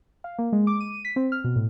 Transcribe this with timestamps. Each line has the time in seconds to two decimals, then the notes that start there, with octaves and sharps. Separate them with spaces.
0.24 F5
0.39 A#3
0.53 G#3
0.67 D6
0.80 D#7
1.05 B6
1.16 C4
1.32 F6
1.44 B2
1.56 A2